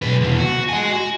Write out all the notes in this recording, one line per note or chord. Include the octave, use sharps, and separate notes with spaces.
B1 B4
E2 B2
F#4
D#5 G#5
F#4